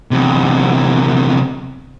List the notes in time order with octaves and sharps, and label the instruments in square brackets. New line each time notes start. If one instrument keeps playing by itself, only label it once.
[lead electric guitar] E2 C3